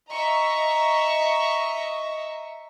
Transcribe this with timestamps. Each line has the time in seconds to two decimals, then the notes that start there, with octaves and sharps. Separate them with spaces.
0.11 D#5 E5 A#5 C#6